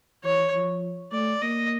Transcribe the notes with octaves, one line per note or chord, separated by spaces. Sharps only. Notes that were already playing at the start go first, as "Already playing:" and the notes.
E3 C#5
F3
A3 D5
A#3 D#5